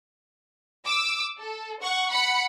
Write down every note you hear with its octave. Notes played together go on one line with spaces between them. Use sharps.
D6 E6
A4
F#5 C#6
F#5 B5 C#7